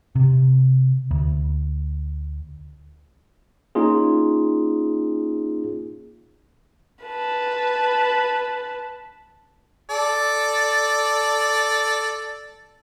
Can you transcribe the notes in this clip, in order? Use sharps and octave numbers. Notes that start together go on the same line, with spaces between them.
C3
D2
A#3 C#4 D#4 F4 G#4
B4 A5
A4 D5